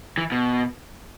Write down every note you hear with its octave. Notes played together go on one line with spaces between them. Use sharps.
E3
B2